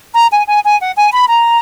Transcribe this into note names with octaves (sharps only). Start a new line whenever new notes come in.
A#5
G#5
G#5
G#5
F#5
G#5
B5
A#5